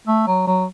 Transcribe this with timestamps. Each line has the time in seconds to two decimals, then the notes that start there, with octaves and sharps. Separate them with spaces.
0.08 A3
0.27 F#3
0.47 F#3